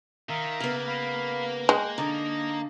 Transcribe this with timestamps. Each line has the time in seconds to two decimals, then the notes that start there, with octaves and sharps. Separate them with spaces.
0.29 D#3 A#4 E5 F5
0.60 C#3 A#3 B3
0.87 F5 B5
1.69 G#3 G5 F#6
1.98 D3 D#4 A#5